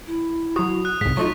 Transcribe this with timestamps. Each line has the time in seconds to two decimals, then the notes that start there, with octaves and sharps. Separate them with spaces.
0.07 E4
0.56 F#3 F#4 D#6
0.85 F#6
1.01 C2 G#2 B6
1.17 F#3 A3 D#4 F4 C#6